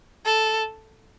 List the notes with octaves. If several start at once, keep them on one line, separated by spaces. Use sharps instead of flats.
A4